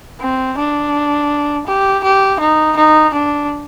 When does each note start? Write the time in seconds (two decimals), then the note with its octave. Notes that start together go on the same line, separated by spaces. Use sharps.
0.20 C4
0.57 D4
1.66 G4
2.03 G4
2.39 D#4
2.76 D#4
3.13 D4